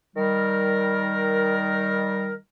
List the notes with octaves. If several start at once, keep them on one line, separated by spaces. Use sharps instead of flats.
D#3 G3 A#4